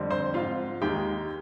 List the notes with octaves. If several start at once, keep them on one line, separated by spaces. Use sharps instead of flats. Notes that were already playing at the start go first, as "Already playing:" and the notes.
Already playing: F2 D3 G3 C4
C5 C6
G#2 F3 C4 F4 F5
D#2 D#3 G#3 D#4 G4 G5